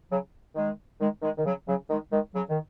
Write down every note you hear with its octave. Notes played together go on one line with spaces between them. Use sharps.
C#3 F#3
D#3 G#3
D#3 G#3
D#3 G#3
D#3
C#3 F#3
C#3 F#3
D#3 G#3
D#3 G#3
C#3 F#3
D#3